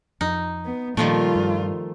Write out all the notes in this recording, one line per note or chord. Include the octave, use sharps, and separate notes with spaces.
F2 D#4
B3
A#2 D#3 F3 G3 A3 A#3 F4
G2